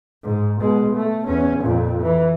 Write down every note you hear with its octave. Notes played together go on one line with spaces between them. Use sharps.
G#2
B2 G#3
A3
E2 C#4
F2 A#2
E3